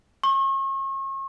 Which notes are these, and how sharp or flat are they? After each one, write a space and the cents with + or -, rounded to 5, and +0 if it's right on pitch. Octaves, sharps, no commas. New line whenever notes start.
C#6 -40